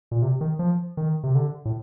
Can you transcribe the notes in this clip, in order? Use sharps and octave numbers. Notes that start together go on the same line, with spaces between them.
A#2
C3
D#3
F3
D#3
C3
D3
A2